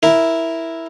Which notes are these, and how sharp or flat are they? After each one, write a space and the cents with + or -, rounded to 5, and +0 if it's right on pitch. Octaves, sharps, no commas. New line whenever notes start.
E4 +0 A#4 +0